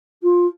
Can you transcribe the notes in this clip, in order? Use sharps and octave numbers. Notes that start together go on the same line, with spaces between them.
F4